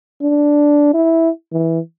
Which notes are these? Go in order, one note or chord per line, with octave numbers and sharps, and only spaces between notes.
D4
E4
E3